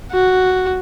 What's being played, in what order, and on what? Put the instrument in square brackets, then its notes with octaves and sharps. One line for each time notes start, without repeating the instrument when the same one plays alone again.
[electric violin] F#4